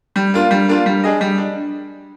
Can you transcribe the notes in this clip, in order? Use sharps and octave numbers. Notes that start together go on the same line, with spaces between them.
G3
A#3 D4 F4
G3
A#3 D4 F4
G3
D4 G#4 D#5
G3
D4